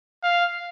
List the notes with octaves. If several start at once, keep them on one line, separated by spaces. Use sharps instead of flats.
F5